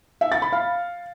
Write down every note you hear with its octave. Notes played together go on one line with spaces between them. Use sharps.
E5
A6
B5
F5